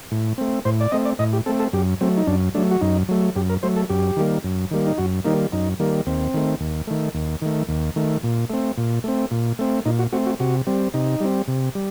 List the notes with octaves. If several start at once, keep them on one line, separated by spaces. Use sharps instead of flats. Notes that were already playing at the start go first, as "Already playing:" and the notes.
A2
A3 C4
A2 C5
D5
A3 C4 D#5
D5
A2 D#5
G4
A3 C4 A4
A4
F#2 G4
F#3 A3 C4
D#4
F#2 D4
F#3 A3 D4
F#4
F#2 D#4
F#3 A3
F#2 G4
A#4
F#3 A3 C5
A4
F#2 G4
D#3 G3 A#3
F#2
D#3 G3 A#3
D#4
F#2 F#4
D#3 G3 A#3 D#4
F#2 D#4
D#3 G3 A#3
D#2 C4
D#3 A3
D#2
D#3 A3
D#2
D#3 A3
D#2
D#3 A3
A#2
A3 C4
A#2
A3 C4
A#2
A3 C4
A#2 D#4
F#4
A3 C4 F#4
F#4
C3 F#4
G3 C4
C3 D#4
G3 C4
C3
G3